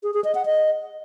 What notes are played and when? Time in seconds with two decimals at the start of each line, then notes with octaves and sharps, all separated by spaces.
0.03 G#4
0.14 G#4
0.24 D#5
0.35 F#5
0.45 D#5